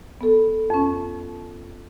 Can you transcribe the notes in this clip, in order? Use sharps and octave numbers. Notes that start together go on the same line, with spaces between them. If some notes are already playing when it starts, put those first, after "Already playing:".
B3 A4
F2 C#4